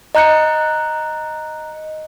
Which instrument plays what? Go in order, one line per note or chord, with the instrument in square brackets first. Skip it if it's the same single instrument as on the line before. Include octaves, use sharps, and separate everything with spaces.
[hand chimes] D#5 A#5 F#6 G6 C#7